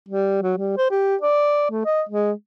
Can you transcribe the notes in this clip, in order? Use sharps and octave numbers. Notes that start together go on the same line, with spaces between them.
G3
F#3
G3
C5
G4
D5
A3
D#5
G#3